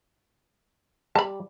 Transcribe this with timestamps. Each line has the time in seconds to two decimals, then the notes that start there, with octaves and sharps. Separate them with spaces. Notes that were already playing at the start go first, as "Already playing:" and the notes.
1.15 G3 A5 B5